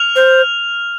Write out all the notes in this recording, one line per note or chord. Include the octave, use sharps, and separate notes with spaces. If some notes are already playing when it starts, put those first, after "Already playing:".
Already playing: F6 F7
C5